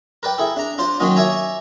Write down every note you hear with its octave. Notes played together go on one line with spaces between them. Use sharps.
A#4 B4 D5 G5
E4 G#4 A4
D4 A#5
D4 F4 C5 D5
D#3 F#3 A#3 C#4 F4 D#5
C#5 D5 E5 G#5 A#5